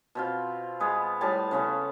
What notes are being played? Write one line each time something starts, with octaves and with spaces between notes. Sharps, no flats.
B2 C4 F4
G#3 B3 G#4
A2 G3 G#5 A5
C#3 B3 C#4